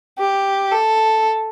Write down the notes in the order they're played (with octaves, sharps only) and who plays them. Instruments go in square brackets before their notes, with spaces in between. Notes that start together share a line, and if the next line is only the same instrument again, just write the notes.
[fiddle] G4
A4